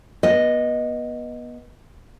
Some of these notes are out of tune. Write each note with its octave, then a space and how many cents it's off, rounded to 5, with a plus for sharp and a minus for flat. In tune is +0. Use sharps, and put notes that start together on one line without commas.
B3 -30 D#5 +0